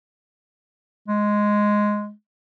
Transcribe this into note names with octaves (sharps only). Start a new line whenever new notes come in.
G#3